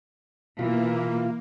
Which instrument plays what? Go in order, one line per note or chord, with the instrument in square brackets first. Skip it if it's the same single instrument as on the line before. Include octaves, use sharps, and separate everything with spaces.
[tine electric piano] B2 [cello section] E3 [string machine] A#3 [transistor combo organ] F4